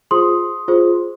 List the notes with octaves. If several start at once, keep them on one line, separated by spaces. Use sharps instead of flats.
F4 G#4 C5 C6 D#6
F4 G#4 C5